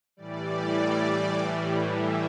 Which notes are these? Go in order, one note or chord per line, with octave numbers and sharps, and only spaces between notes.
A2 E3 G3 D5
A2 E3 G3
E5